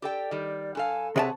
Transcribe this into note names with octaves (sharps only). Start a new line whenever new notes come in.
G4 A4 D5 G5
D#3 G3
G2 A4 F5 G#5
C3 G#4 C#5 D5 E5 F#5 A5